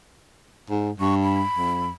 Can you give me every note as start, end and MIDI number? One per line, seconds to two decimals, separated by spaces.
0.70 0.91 44
1.00 1.44 43
1.00 1.15 85
1.23 1.90 83
1.56 1.91 41